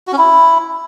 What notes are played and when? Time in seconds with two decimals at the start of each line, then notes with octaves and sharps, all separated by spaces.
0.07 F#4
0.13 C#4
0.18 E4